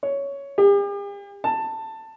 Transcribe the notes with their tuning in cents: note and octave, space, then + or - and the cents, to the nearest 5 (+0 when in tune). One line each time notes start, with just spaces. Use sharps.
C#5 +10
G4 +45
A5 +15